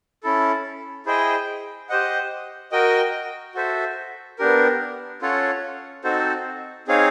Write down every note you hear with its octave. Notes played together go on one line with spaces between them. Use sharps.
C#4 E4 A4
E4 G#4 C5 D#5 G5
G4 C5 D#5 F#5
F#4 A#4 D#5 G5
F#4 A4 C5 E5
B3 D4 G4 A#4
C#4 F4 A4 C#5 F#5
C4 D#4 F#4 A4 C5
C4 D#4 G#4 C#5 F5